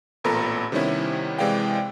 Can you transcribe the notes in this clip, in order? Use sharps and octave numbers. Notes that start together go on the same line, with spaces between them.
A1 A#2 B3 A4 A#5 B5
C3 D#3 G3 B3 C#4 E4
C3 E3 G#3 D5 F5 G5